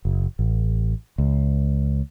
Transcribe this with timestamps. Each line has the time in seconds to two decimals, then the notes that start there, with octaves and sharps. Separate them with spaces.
0.05 F#1
0.39 A1
1.18 C#2